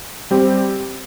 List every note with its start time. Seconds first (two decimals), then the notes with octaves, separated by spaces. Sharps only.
0.31 G3 C4 G4